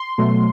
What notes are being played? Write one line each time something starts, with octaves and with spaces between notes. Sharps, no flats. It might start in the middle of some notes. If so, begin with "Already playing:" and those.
Already playing: C6
B2 F#3 A3